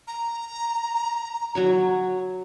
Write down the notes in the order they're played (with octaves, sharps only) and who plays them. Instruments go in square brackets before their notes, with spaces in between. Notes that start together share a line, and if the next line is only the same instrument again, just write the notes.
[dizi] A#5
[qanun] F#3 F#4 C#5